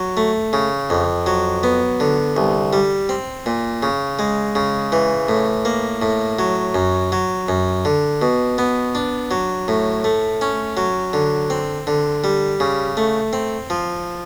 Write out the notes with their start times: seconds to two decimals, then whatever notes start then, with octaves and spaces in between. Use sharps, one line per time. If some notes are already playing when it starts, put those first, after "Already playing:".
Already playing: F#3
0.17 A3
0.53 C#3
0.90 F2
1.26 F#3
1.63 B3
2.00 D3
2.37 C2
2.73 G3
3.09 C4
3.46 A#2
3.83 C#3
4.19 G#3
4.55 C#3
4.92 E3
5.29 A2
5.65 A#3
6.02 A2
6.39 F#3
6.74 F#2
7.12 F#3
7.48 F#2
7.85 D3
8.22 B2
8.58 B3
8.95 D4
9.31 F#3
9.68 A2
10.04 A3
10.41 C#4
10.77 F#3
11.13 D3
11.50 C4
11.87 D3
12.24 G3
12.60 C#3
12.97 A3
13.33 C4
13.70 F3